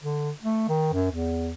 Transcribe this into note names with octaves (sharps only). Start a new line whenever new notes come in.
D3
A3
D#3
F#2
E2